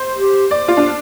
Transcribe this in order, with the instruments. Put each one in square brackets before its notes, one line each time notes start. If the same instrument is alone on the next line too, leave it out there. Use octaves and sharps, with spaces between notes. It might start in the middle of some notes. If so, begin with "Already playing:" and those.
Already playing: [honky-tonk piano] C5
[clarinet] G4
[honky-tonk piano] D5
F4
D4